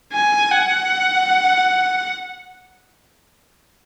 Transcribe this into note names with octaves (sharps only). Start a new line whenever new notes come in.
G#5
F#5